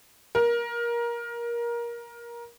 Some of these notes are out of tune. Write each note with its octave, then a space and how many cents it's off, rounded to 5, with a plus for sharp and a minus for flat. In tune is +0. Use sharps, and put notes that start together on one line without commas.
A#4 +20